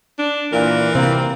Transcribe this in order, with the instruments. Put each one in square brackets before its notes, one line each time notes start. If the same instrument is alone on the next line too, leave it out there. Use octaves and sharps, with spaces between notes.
[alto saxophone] D4
[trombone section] A#2 [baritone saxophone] E3 [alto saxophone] A#4
[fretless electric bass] C3 [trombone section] A#3 [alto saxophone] C4